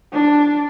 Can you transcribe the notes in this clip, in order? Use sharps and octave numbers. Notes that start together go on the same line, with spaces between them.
D4